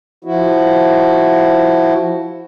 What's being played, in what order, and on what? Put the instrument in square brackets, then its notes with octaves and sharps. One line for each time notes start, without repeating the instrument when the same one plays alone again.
[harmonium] F3 E4 F#4